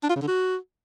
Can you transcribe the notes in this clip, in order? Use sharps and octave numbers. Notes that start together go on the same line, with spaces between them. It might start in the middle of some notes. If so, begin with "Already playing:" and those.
D4
F4
C#3
D3
F#4